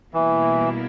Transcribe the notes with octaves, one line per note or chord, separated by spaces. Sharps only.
B2 E3 G3 A#3 E4